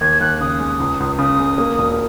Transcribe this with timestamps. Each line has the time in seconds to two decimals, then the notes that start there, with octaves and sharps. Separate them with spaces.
0.01 D#2 G#6
0.21 D#2 F#6
0.41 C#3 D#6
0.60 G#3
0.80 C#2
1.00 C#2
1.19 C#3 D#6
1.39 G#3
1.58 A#3
1.78 E1